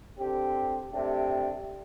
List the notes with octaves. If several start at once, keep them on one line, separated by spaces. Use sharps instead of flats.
D3 C4 G4
C3 A3 D4 G4